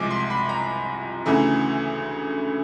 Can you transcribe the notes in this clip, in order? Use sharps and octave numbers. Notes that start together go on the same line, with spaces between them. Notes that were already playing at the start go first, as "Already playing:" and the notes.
Already playing: C2 C3 F3 G#3 D6
C6
B5
A#5
D2 C#3 E3 A3